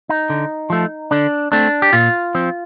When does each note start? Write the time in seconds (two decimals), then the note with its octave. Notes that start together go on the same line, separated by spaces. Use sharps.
0.09 D#4
0.30 D3
0.70 F3 A3
1.11 D3 D4
1.52 A3 C4 D4
1.82 G4
1.93 A#2 F4
2.35 F3 C4